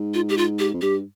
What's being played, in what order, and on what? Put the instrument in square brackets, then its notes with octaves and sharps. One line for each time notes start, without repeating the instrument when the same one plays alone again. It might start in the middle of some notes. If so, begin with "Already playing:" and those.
Already playing: [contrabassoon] G#2
[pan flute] F4
G4
F4
G4
[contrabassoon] F2
[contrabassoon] G2 [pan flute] G4